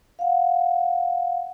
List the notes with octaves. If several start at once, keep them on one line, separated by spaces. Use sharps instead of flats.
F5 F#5